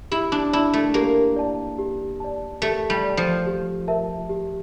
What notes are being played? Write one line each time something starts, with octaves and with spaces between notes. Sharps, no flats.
E4 G4
D4
E4 D5 A5
A3
A#3 G4
D5 A5
G4
D5 A5
A3 G4
G3
D5 A5
F3
G4
A#4 E5 A5
G4